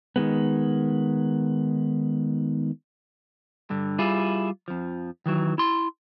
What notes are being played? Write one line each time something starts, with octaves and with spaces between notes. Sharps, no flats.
D#3 G#3 B3
G2 D3
G3 E4 F4 G#4
F2 F3
D#3 E3 F#3
E4 C6